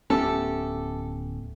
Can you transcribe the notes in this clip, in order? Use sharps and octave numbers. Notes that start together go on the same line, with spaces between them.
D1 A3 B3 C#4 G4 A4 D6